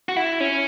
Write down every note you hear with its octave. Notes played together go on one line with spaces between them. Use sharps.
F#4
E4
C#4